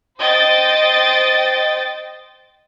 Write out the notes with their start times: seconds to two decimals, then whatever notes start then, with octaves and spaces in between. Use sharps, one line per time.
0.19 C5 D#5 G5 A6